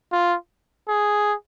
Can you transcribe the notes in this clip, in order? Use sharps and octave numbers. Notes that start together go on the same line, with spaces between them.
F4
G#4